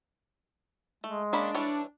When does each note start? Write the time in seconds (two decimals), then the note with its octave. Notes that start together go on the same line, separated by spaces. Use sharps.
1.04 G#3 A3
1.33 A#3 C#4 D4 B5
1.55 E3 G3 C#5